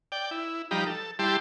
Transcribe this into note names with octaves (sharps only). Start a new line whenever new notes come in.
D5 G5
E4
F3 G3 D#4 G4 A#5 B5
A4
G3 E4 G4 A5 C6